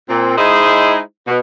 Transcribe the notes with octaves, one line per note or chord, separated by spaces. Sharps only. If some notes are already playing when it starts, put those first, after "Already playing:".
A#2 C4
G#3 D#4 E4 G#4 C5 D#5
B2